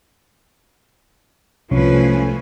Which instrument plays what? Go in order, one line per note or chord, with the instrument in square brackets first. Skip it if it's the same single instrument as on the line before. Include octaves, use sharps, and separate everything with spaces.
[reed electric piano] C2 [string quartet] F3 B4 [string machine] A3 G#5 [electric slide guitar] C#4